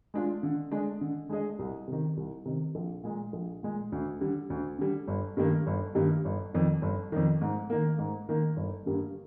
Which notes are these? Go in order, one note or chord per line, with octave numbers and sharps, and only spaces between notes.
G#3 D4 F4
D3
G#3 D4 G#4 D#5
D3
G#3 D4 G#4 D#5
C2
C3 D#3
C2
C3 D#3
A#1
A#2 G#3
A#1
A#2 G#3
D2
D3 G3
D2
D3 G3
G1
G2 D#3 G3 A#3
G1
G2 D#3 G3 A#3
G1
F2 D#3
G1
F2 D#3
G#2
D#3 A#3
G#2
D#3 A#3
G1
G2 D3 G3 A#3